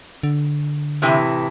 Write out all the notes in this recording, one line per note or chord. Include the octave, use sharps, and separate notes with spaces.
D3
A2 C3 E3